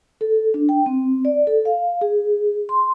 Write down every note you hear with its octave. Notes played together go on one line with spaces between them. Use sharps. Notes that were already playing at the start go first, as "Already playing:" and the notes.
A4
D4
G5
C4
D5
A4
F5
G#4
C6